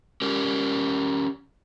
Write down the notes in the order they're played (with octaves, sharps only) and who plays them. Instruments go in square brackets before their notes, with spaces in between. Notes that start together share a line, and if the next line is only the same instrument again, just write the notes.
[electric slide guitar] C#4 G4 A#4